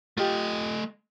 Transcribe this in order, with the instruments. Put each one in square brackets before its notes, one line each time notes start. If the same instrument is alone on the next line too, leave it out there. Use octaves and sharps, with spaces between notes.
[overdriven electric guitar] A3 D#5 [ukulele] F4 G4